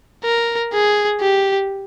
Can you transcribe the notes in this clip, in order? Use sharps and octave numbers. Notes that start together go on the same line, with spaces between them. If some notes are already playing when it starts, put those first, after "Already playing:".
A#4
G#4
G4